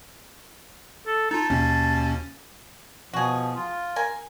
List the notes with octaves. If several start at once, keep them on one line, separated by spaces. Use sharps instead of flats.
A4
D#4 F4 A5
D#2 B2 C#4
B2 F3 F#4 G#4
F4
A#4 G#5